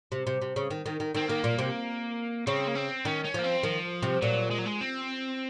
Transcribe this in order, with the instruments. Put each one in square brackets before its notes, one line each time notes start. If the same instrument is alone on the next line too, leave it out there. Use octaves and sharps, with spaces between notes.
[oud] C3
C3
C3
C#3
D#3
D#3
D#3
[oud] D#3 [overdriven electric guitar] C4
[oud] D#3 [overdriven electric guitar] A#3
[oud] A#2
C3
[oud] C#3 [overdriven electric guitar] C4
[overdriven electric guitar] A#3
C4
[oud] D#3 [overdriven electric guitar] C#4
[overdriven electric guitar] C#4
[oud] F3 [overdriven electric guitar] A#3
[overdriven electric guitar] C4
[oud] D#3 [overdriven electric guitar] F3
[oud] C3
[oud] A#2 [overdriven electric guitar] F#3
[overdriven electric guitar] G#3
F#3
G#3
C4